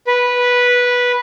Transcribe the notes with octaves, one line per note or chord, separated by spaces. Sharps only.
B4